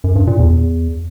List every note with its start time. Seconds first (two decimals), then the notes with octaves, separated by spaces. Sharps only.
0.04 F#2
0.16 G2
0.27 A#2
0.39 E2